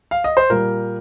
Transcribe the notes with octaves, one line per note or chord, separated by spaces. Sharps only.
F5
D#5
C5
A#2 G3 A#4